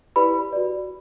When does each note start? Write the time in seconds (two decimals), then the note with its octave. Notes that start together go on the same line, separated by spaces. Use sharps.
0.16 E4 G4 B4 D5 B5
0.53 F#4 B4 D5